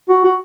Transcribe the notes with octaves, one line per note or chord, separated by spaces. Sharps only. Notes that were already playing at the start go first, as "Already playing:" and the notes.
F#4
F#4